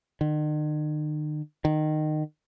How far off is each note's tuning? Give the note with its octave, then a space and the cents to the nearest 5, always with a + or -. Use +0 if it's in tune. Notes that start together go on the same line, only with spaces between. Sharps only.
D#3 -45
D#3 -20